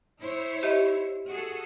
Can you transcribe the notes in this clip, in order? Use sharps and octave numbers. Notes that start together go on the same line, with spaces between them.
E4 C5 C#5
G4 D#5 E5
F#4 G#4 A4